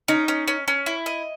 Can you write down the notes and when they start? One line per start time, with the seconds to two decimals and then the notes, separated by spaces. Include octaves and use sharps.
0.08 C#4 D#4
0.28 C#4
0.48 C#4
0.68 C#4
0.86 E4
1.06 D#5